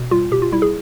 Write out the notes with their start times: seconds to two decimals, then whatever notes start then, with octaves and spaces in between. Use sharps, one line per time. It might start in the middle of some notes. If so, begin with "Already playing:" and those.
Already playing: B2
0.11 G3 F4
0.32 B2 G4
0.42 F4
0.52 G3 E4
0.62 G#4